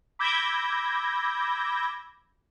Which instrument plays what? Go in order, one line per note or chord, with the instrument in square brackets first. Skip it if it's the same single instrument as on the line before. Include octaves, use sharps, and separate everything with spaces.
[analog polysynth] B5 D6 E6 G6 G#6 A#6